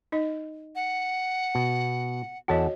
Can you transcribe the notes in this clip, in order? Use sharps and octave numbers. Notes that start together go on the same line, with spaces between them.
D#4 D#5
F#5
B2
E2 F#4 A4 C#5 D#5 F#5